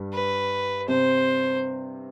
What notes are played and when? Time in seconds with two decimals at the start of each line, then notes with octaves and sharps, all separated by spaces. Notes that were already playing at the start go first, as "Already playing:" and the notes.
Already playing: G2 G3
0.13 B4
0.88 C3 C4 C5